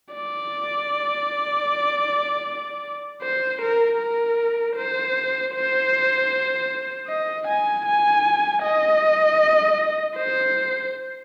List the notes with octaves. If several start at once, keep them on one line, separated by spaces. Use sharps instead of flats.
D5
C5
A#4
A#4
C5
C5
D#5
G#5
G#5
D#5
C5